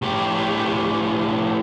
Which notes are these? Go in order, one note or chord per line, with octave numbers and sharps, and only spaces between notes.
A2 G4